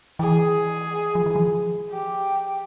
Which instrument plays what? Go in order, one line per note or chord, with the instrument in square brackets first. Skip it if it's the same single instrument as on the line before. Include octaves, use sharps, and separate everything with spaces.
[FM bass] E3 [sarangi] G#4
[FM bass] F3
E3
F3
[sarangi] G4